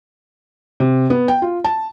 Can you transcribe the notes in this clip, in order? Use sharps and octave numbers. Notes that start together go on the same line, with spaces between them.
C3
B3
G5
F4
A5